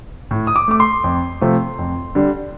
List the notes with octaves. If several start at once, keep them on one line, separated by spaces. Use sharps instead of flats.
A2
D#6
D6
A3 D6
C6
F2
C3 F3 A3
F2
D3 G3